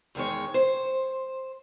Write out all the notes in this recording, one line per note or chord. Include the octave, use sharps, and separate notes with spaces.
E2 D#3 G#3 C#5
C5